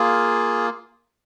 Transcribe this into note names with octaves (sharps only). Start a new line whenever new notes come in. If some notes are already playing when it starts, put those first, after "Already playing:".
Already playing: A#3 F4 G#4